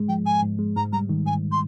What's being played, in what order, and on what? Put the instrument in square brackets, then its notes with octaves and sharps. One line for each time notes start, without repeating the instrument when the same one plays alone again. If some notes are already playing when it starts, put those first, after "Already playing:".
Already playing: [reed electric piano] G#2 G#3
[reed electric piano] F3 [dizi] G5
[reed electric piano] G#2 [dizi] G#5
[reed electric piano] G#2
G#3
[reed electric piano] G#2 [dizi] A#5
[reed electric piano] G3 [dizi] A#5
[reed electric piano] D#3
[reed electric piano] G#2 [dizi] G#5
[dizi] C6